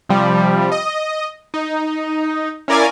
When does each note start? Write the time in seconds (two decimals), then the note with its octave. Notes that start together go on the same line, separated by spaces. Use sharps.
0.09 C3 F3 G3
0.72 D#5
1.54 D#4
2.68 C#4 E4 A#4 D5 F5 G#5